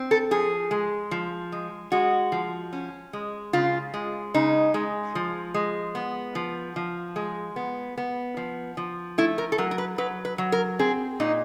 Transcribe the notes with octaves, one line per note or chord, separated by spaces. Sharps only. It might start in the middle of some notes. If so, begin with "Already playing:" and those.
Already playing: C4
A4
F3 G#4
G#3
F3
G#3
G#3 F#4
F3
C#4
G#3
C#3 F4
G#3
C#3 D#4
G#3
F3
G#3
B3
F3
F3
G#3
B3
B3
F3
F3
A3 E4
A#4
A4
F#3 A#4
A#4
B4
F#3 B4
B4
F#3
A#4
C4 G#4
A#2 D#4